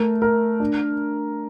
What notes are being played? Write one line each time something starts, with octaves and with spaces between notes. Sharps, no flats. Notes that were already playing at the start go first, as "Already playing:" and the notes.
Already playing: A3 A#4
A#4
D4